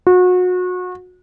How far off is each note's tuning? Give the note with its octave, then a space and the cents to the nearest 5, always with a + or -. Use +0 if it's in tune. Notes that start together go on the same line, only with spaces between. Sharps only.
F#4 -30